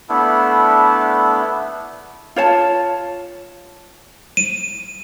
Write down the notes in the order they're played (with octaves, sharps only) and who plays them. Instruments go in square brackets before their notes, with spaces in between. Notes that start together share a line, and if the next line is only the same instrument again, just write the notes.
[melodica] A3 B3 D4 E4
[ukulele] F4 C#5 A5
[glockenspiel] D#7